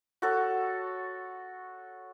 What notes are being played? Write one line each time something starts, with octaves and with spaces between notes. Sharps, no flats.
F#4 A4 C#5